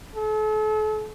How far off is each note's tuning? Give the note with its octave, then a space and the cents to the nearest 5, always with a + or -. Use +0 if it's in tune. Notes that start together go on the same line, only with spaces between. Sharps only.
A4 -40